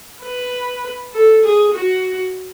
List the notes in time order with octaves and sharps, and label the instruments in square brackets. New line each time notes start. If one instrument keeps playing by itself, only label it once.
[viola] B4
A4
G#4
F#4